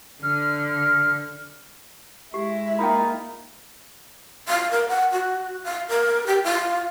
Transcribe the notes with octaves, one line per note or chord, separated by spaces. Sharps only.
D3 F6
G#3 E4 G4
A#3 D#4 F4 G5 B5
F5
A#4
F#5
F#4
F5
A#4
G4
F4